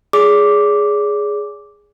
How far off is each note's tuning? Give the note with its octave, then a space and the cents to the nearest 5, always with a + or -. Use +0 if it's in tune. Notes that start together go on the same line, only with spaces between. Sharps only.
G#4 +0 D5 -45 D6 -5